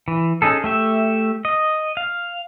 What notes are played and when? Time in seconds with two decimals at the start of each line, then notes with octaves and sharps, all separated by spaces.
0.08 E3
0.42 C#4 D#4 G#4 A4
0.64 A3 G4 E5
1.45 D#5
1.97 F5